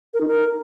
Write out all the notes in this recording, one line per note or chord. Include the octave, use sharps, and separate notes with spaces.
A#4
D#4
A#4